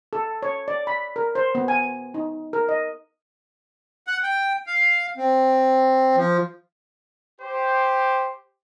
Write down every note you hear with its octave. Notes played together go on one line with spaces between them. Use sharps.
A4
C#5
D5
B5
A#4
C5
B3
G#5
D#4
A#4
D#5
F#5
G5
F5
C4
F3
G4 C5